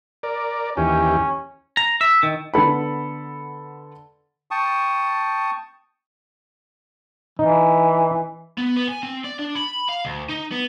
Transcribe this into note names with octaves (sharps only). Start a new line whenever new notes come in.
A#4 D5
D#2 E3 C#4 G4
A#5
E5
D#3
D3 B3 A4 B5
G5 A5 C#6 D#6
E3 D#4
B3
B3
G#5
C4
D5
D4
B5
F5
D2
D#4
B3